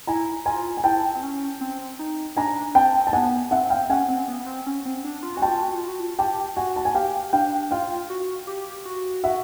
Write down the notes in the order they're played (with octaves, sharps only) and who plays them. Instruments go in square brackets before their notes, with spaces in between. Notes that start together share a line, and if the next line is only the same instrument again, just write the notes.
[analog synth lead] E4 [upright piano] G#5 A#5
[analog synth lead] F4 [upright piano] G#5 A#5
[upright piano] G#5
[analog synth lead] E4 [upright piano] G5 A5
[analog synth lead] C4
C#4
C4
D#4
[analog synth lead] D4 [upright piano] G#5 A#5
[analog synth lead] C4 [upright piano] G5 A5
[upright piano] A5
[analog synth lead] B3 [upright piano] F#5 G#5
[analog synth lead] C4 [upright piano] E5 F#5
[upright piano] F5 G5
[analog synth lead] C#4 [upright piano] F#5 G#5
[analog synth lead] C4
B3
B3
C4
C#4
C4
D4
F4
[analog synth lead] F#4 [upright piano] G#5
[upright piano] G5 A5
[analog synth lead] F4
F#4
F4
F#4
F4
[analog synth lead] G4 [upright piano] G5 A5
[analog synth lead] F#4 [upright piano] F#5 G#5
[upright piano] A5
G#5
[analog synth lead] G4 [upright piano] F5 G5
[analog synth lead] D4 [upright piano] F5 G5
[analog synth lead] F4 [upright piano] F5 G5
[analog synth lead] F#4
G4
F#4
[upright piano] E5 F#5